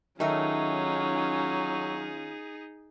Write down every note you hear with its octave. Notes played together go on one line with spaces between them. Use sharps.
D#3 F#3 A3 C#4 D#4 F4 G#4 A#4